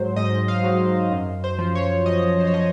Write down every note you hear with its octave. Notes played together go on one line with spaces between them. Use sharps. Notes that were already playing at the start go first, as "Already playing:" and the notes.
Already playing: G#2 F#3 C5
G#2 D#5
F5
F#3
F#2
C5
F3
C#5
F#2 D#5
C5
C#5
F3 D#5